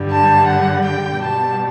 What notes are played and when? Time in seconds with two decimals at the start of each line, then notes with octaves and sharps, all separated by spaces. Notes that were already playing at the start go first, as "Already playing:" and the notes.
Already playing: G2 D3 G3
0.11 A5
0.47 F#5
0.85 G5
1.21 B2 G3 A5